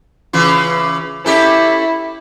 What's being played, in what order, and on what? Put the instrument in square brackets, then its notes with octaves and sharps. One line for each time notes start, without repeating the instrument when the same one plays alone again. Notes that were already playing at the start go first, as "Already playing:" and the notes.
[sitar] C#3 E3 F4
[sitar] C#4 G4 A4 [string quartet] E4